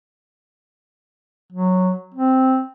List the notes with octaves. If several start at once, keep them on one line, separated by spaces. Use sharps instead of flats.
F#3
C4